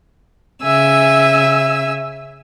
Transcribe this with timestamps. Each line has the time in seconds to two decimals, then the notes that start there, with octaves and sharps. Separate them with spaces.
0.63 C#3 E5 G#5 E6